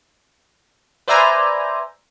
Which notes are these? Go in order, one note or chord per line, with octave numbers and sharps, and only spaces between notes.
B4 C5 D5 E5 G#5 A#5